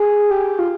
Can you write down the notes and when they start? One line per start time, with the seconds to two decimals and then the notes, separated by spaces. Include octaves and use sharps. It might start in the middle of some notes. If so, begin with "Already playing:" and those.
Already playing: G#4
0.31 G4
0.59 F4